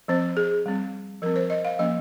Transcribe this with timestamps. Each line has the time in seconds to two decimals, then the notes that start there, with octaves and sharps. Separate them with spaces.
0.08 F3 C4 C5
0.37 G#4
0.66 G3 C4
1.22 F3 A#4
1.26 C4
1.36 C5
1.50 D#5
1.65 F5
1.79 F3 A#3 C#4 D#5